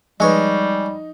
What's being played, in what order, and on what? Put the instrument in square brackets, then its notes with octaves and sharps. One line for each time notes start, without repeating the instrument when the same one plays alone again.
[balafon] F3 B4 [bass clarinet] G3 [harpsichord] G#3 C#5 [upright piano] D#4